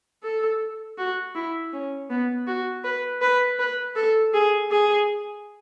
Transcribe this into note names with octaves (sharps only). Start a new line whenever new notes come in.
A4
F#4
E4
C#4
B3
F#4
B4
B4
B4
A4
G#4
G#4